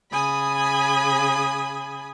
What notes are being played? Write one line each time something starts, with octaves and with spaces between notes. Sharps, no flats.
C#3 G#5 B5 D#6